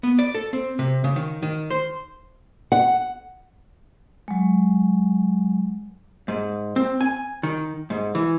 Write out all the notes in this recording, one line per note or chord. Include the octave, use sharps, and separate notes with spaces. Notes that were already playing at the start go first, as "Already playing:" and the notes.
B3
D5
A4
C4
C3
C#3
D#3
D#3
C5
F#5
F#3 G#3
G#2
C4
G#5
D#3
G#2
E3